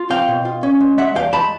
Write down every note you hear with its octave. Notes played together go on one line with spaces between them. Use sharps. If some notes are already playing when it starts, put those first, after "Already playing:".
Already playing: F4
C4 F5 G5
B2
F4
C#4
G#3
G#3 E5 F#5
E2 F5 G5
G#3 A5 B5